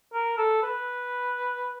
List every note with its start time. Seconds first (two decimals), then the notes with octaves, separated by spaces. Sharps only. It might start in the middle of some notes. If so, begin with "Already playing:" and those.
0.14 A#4
0.38 A4
0.63 B4